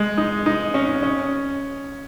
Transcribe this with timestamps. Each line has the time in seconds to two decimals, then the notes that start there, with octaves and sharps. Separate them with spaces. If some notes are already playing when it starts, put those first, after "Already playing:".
Already playing: G#3
0.18 D#4
0.46 D#4
0.74 C#4
1.03 C#4